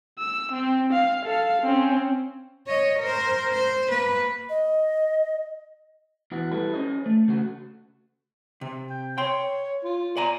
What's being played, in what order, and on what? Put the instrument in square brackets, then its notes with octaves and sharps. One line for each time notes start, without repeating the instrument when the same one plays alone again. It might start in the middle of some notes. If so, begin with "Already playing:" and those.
[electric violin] E6
C4
F5
A4 F5
C4 C#4
[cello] C#5 D#5
A#4 C5
C5
A#3 B4
[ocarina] D#5
[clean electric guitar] E2 E3 F#4
G3 E4 A4 B4
C#4 C5 D#5
A3
C#3 A3 F#4
[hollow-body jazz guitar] C3
[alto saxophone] G5
[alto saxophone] C#5 [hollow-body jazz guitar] G5 C6
[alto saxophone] F4
[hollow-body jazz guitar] D5 G#5 A#5